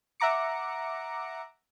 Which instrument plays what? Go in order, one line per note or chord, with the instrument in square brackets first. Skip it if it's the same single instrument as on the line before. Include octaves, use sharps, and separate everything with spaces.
[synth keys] E5 F#5 A#5 D6 C#7